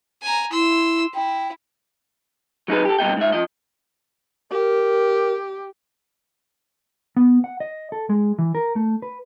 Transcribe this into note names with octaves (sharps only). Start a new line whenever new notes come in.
G#5 A#5
E4 C6 E6
E4 G5
F#3 D#4 G#4 B4
G4 A4
G2 B2 D#5 G5
G#2 E5
F3 D#5
G4 A#4
B3
F#5
D#5
A4
G#3
E3
A#4
A3
B4